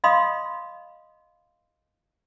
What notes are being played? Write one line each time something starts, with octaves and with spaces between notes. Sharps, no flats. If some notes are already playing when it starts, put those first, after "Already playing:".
D#5 F5 B5 C6 D#6